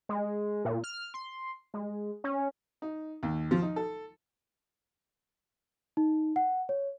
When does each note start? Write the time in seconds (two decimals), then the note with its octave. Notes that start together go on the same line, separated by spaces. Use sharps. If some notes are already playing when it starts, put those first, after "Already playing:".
0.09 G#3
0.65 A#2
0.84 F6
1.14 C6
1.74 G#3
2.24 C#4
2.82 D#4
3.23 D#2
3.51 F3
3.62 D#4
3.76 A4
5.97 D#4
6.36 F#5
6.69 C#5